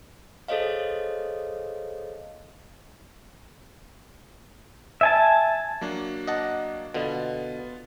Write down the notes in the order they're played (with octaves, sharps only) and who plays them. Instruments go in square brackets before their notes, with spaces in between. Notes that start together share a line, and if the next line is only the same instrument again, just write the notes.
[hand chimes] G#4 A4 C5 C#5 D#5 F5
[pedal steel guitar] E5 G#5 A5
[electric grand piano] F#3 A#3 D4
[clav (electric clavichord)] D#5 F#5 A5
[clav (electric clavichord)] B2 D3 [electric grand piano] B3 F4